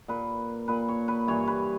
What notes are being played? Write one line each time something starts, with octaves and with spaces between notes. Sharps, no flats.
A#2 B4
A#2 B4
C#5
B4
G2 E3 C#5
B4